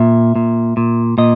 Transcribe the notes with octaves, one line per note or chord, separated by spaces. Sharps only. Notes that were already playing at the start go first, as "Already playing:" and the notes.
Already playing: A#2 E5
A#2
A#2
A#2 D#5